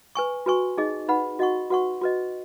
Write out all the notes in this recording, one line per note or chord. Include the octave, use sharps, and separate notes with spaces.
B4 G#5 C#6
F#4 B4 G#5 C#6
D#4 G#4 D#5
D#4 B4 F#5 B5
F#4 D#5 F#5 C#6
F#4 B4 F#5 C#6
F#4 B4 D#5